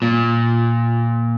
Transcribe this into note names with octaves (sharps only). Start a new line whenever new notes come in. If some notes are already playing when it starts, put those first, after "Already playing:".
A#2